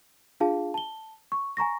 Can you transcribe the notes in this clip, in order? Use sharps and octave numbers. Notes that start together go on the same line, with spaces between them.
D4 F4 G#4 F5 A5
A5 G7
C#6
G#5 A#5 C#6 A#6